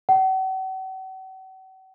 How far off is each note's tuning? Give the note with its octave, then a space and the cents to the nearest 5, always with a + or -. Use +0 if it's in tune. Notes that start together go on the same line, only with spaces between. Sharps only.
F#5 +45